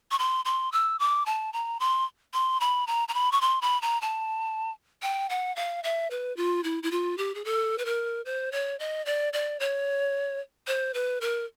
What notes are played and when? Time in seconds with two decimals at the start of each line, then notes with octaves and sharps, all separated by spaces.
0.11 C#6
0.19 C6
0.45 C6
0.72 E6
0.99 D6
1.26 A5
1.53 A#5
1.80 C6
2.33 C6
2.60 B5
2.87 A#5
3.08 A#5
3.14 B5
3.32 C#6
3.41 C6
3.62 B5
3.82 A#5
4.01 A5
5.02 G5
5.30 F#5
5.56 F5
5.83 E5
6.10 B4
6.37 F4
6.64 E4
6.83 E4
6.91 F4
7.18 G4
7.35 G#4
7.45 A4
7.78 B4
7.85 A#4
8.25 C5
8.52 C#5
8.79 D#5
9.06 D5
9.33 D5
9.60 C#5
10.67 C5
10.94 B4
11.21 A#4